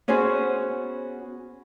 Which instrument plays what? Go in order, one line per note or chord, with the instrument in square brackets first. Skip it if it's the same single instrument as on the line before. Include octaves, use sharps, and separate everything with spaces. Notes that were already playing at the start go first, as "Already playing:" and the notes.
[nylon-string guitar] B3 C#4 F#4 G#4 C5